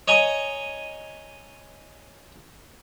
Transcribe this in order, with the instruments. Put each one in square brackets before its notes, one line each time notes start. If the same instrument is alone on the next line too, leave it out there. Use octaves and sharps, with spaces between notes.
[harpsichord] C#5 D#5 G#5 A#5 D#6